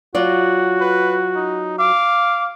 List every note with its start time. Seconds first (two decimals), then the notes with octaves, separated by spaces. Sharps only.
0.15 F#3 F4 F#4 D5
0.81 B4
1.36 D#4
1.79 F5 D6